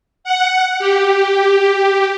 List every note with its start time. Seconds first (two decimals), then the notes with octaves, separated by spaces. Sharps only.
0.24 F#5
0.79 G4